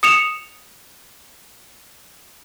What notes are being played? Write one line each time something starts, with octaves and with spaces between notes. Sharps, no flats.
D#6 C#7 E7 F7